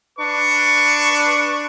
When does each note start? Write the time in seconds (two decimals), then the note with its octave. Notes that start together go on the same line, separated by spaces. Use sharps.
0.19 D4 B4 C#6